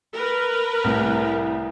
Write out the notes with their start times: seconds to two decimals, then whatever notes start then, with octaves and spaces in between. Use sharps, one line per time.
0.15 A#4 B4
0.84 C2 A2